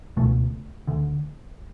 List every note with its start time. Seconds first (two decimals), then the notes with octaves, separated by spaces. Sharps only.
0.17 C#2 B2 A3
0.87 D2 D3